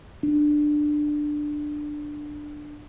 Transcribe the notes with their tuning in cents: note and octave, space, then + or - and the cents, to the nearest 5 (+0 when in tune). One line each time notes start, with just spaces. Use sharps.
D4 +15